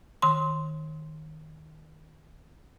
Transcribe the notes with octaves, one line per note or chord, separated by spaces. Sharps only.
D#3 C6